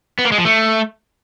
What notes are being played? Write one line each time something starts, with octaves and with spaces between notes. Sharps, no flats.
B3
A#3
G#3
F3
A3